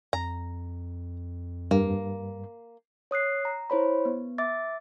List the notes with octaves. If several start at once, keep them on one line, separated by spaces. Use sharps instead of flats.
F2 A#5
G2 A#3
C#5 D#6 F#6 C7
A#5
E4 C5 C#5 B5
B3
E5 D6 A6